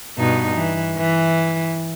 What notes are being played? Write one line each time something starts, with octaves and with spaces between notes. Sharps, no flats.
G2 B2 D#4
E3
E3